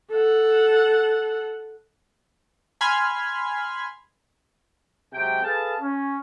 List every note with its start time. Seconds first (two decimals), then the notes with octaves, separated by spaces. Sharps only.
0.12 A4 F#5
2.81 G#5 B5 C6 F6 G#6
5.13 C3 F#3 G#3 G5
5.44 G#4 A4 B4 F5 A5
5.80 C#4